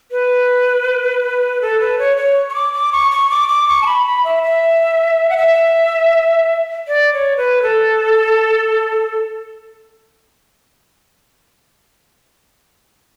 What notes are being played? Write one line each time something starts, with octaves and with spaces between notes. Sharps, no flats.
B4
A4
B4
C#5
C#5
C#6
D6
D6
C#6
C#6
D6
D6
C#6
A5
B5
B5
E5
E5
F#5
E5
D5
C#5
B4
A4